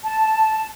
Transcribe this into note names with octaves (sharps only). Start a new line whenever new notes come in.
A5